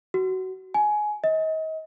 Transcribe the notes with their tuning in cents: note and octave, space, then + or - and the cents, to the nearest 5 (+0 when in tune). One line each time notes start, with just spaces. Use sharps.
F#4 +20
G#5 +20
D#5 +35